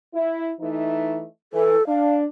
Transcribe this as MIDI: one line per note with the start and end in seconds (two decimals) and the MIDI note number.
0.13 0.49 64
0.60 1.24 52
0.60 1.24 57
0.60 1.24 63
1.53 1.75 52
1.53 1.87 69
1.88 2.26 62
1.88 2.15 77